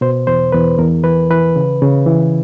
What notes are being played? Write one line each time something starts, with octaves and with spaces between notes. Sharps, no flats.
B2 C5
E2 C5
E2 B4
E2 A#4
E3 B4
E3 B4
C#3
C#3
E3